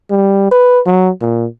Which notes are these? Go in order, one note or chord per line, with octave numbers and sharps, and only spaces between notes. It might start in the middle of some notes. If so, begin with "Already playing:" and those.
G3
B4
F#3
A#2